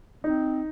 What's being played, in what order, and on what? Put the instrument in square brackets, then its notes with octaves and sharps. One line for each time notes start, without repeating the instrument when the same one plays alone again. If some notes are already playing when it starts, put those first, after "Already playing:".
[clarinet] C4 [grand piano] D#4